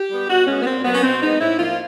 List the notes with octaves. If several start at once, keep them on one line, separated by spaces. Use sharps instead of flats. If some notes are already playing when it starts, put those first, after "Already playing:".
Already playing: G4
G3 B3
B2 F#4
G#3 B3 C#4
B3
A#2 C4
F#3 A#3 B3
C#4
B2 C4
G#3 B3 D#4
A2 E4
F3 A#3 F4